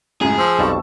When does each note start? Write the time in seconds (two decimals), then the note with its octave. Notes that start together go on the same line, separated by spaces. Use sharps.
0.21 C#2 F#2 A2 G#4
0.39 F3 E6
0.59 B1 F2 G3 A5 C#6